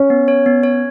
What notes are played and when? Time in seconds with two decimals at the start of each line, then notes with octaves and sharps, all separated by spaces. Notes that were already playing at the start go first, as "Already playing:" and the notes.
Already playing: C#4
0.10 B3
0.28 C#5
0.46 B3
0.63 C#5